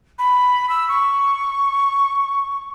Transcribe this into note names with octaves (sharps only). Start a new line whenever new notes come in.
B5
E6
C#6